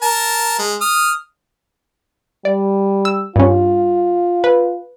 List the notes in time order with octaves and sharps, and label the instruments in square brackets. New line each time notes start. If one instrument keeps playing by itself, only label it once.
[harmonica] A#4 A5
G#3
D#6 F6
[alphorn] G3 [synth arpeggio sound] D5
[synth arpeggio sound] E6
[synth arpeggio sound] G2 C#4 [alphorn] F4
[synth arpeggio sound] B4